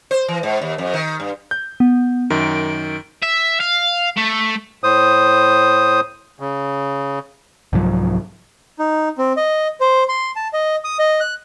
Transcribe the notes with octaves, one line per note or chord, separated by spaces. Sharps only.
C5
E3
G#2
D#2
F2
D#3
G2
G6
B3
F#2 D#3 D7
E5
F5
A3
A2 C5 D#6
C#3
C2 G#2 F3 F#3
D#4
C4
D#5
C5
C6
A5
D#5
D#6
D#5
F#6